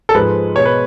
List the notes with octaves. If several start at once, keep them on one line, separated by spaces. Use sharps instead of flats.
A4
G#2 F3 G#3 B4
B2 G#3 C#5
B4